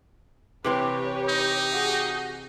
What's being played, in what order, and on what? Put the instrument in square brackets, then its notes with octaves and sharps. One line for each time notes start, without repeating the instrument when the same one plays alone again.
[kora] C3 E3 C4 [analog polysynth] G4 [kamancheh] B4 C#5
[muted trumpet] D#4
[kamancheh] F#4 G#4